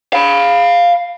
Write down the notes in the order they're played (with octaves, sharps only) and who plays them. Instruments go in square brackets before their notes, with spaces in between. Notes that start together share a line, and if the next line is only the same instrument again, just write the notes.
[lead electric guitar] F5 B5